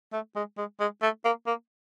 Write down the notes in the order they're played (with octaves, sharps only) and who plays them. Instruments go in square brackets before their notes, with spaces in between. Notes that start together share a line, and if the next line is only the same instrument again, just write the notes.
[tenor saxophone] A3
G#3
G#3
G#3
A3
A#3
A#3